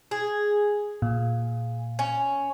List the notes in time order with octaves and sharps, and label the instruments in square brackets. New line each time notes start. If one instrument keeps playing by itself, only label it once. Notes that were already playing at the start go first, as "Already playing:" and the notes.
[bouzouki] G#4
[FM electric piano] A#2
[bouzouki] C#4